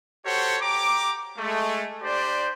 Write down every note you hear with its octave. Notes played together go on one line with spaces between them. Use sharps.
F#4 G4 A4 C5 C#5
G4 A#5 D6
G#3 A3
D4 G4 C5 D5